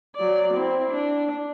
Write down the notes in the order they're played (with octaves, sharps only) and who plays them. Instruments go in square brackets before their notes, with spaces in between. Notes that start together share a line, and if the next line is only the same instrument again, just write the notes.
[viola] F#3 D5
C4 E4
D4